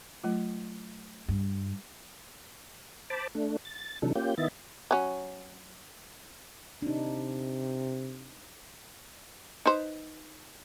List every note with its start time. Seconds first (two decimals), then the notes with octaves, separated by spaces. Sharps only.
0.23 F#3 A3 F4
1.28 G2
3.10 C5 A5 B5 D6
3.35 A3 D4
3.65 A6
4.02 C3 E3 F#3 D4 D#4 A4
4.15 A#3 C#4 F4 G4 G6
4.38 D#3 B3 E4 D#5 E5 A6
4.91 F#3 C#4
6.82 C3 D4 D#4
9.66 D#4 B4 C5